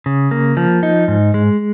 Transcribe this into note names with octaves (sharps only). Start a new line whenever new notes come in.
C#3
A#3
F3
D#4
G#2
G#3